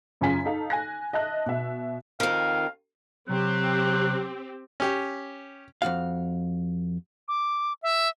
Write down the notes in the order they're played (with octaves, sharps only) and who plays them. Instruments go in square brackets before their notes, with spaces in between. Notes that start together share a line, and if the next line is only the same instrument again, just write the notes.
[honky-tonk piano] F#2 C#3 C#4 F4 G#5 B6
D#4 A4 F5
G#5 F#6 A#6
D#5 E5 A5 F#6
B2 E5
[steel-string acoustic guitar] F2 D#3 [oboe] F5
[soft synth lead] C3 [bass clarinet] F#3 [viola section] C4 G4 [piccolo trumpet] F#6
[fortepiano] C#4 G4
[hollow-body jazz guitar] F2 C3 F#4 F5
[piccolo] D6
E5